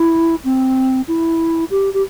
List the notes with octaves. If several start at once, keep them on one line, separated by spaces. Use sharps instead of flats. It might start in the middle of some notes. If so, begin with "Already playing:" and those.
Already playing: E4
C4
E4
G4
G4